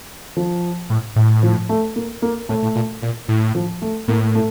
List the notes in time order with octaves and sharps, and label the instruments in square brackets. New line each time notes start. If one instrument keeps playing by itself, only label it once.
[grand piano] F3
[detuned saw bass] A2
A2
[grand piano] F3
A3
A#3
A#3
[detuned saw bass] A2 [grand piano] A3
[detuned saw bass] A2
A#2
A#2
A2
[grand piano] F3
A3
[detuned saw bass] A2 [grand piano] A#3
[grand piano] A3